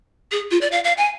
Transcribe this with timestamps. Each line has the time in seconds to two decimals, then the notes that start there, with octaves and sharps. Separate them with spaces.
0.32 G#4
0.51 F4
0.61 D5
0.72 F5
0.84 F5
0.97 G#5